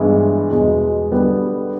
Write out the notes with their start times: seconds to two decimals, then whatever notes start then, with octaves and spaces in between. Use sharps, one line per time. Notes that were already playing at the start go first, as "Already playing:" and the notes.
Already playing: G2 E3 G#3 B3 E4
0.49 E2 B2 G#3
1.11 D3 G3 B3 D4